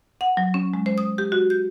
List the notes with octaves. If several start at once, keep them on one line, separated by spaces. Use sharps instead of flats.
F#5
F#3
C#4
G#3
C5
D#6
G4
F#4
G6